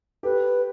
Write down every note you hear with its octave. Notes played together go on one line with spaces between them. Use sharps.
G4 A4 B4